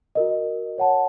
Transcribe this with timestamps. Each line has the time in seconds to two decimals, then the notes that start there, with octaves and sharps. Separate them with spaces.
0.15 F#4 A#4 D#5
0.78 C#5 F#5 A5